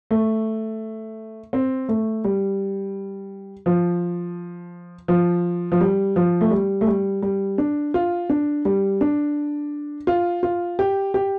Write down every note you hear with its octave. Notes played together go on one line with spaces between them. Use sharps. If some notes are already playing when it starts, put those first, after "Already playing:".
A3
C4
A3
G3
F3
F3
F3
G3
F3
A3
G3
A3
G3
G3
D4
F4
D4
G3
D4
F4
F4
G4
G4